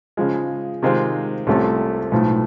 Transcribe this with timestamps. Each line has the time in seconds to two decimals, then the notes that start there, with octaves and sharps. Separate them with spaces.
0.17 C#3 F3 G#3
0.83 C3 D#3 G#3 C4 F4
1.47 C2 C3 F3 A3 C#4
2.11 B1 A2 F3 A3